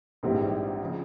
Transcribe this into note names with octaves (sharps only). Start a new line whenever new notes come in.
A#1 G#2 E3 G3 C4
C#3 F3